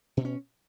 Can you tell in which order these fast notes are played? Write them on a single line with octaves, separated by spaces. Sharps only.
B2 C4 C#4